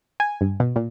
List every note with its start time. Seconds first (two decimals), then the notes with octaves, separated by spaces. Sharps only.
0.20 G#5
0.41 G2
0.60 B2
0.76 A#2